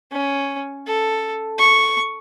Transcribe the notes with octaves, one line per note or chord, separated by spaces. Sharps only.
C#4
A4
C#6